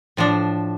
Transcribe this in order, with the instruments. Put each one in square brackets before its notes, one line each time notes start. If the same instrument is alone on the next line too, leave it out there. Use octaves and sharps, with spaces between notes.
[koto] A2 F3 D4